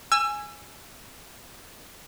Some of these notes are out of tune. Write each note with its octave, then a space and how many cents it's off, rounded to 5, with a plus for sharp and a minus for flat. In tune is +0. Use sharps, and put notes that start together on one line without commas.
G#5 +0 E6 +30